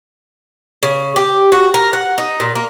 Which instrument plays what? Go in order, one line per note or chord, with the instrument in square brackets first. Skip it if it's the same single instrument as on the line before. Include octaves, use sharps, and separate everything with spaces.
[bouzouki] C#3
G4
F#4
A#4
F#5
D#4
A#2
A#3